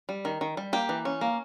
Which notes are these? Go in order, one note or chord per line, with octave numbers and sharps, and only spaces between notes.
G3
D#3
D#3
G3
A#3 G4
E3
C#4
A#3